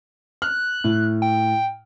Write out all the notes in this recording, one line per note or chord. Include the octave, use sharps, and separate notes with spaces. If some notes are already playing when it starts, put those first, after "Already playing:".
F6 F#6
A2
G5